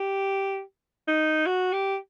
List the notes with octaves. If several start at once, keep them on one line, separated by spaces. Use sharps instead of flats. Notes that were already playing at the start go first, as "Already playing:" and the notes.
Already playing: G4
D#4
F#4
G4